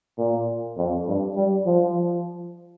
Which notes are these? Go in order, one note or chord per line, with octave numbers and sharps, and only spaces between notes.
A#2
F2
G2
G3
F3